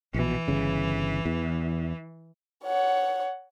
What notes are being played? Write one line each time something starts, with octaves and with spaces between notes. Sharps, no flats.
A#1 B2 E3
G1 C#3
E2
C#5 F#5